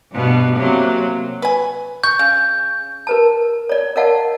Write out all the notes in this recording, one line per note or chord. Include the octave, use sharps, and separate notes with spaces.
G2 B2 B3
C3 F#3 A#3
B4 G#5
C#6 G6
C#3
A#4 B4 A5
C#5 D5
A#4 C#5 D#5 F5 F#5 A5